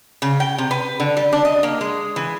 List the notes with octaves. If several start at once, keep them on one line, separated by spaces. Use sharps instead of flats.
C#3
G5
C3
B4
D3
G3
D4
D#5
A#3
G#3
E3